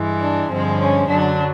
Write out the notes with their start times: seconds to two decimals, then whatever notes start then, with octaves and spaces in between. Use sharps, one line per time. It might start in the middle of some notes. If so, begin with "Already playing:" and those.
Already playing: G2 E3 G#3
0.21 D4
0.51 G2 D3 F3 G#3 C4
0.80 C#4
1.09 F#2 D3 F#3 D4